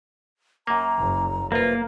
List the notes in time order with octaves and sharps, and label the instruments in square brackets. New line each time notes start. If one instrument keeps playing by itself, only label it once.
[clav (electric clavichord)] F#2 A#3 [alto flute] A#5
[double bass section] F#1
[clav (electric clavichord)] C2 F4 [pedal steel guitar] A#3 [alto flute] B4